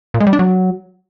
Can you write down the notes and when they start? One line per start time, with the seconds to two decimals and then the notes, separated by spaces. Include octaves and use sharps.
0.14 A#2
0.20 G#3
0.27 G3
0.33 D4
0.39 F#3